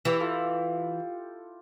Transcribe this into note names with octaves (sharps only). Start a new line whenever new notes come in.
E3 E4 G4
F4 A4